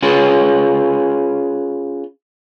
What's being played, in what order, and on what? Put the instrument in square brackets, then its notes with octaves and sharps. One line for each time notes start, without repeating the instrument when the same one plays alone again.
[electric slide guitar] C#4 F4 G#4 B4